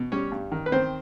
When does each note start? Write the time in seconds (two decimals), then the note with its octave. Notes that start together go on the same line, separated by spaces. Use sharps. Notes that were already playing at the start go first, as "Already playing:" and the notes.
Already playing: B2
0.12 G3 C#4 C#5
0.32 G2
0.52 D#3
0.66 B4
0.72 D#3 C4 C5